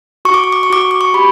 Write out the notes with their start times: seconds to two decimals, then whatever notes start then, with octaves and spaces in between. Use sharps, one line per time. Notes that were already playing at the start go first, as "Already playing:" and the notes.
0.25 F#4 C#6
0.34 D6
0.44 C#6
0.52 D6
0.63 C#6
0.70 F#4 D6
0.81 C#6
0.91 D6
1.01 C#6
1.14 G4 B5